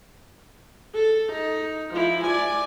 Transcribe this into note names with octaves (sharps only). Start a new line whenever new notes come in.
A4
D#4
F3 E4
D5 G#5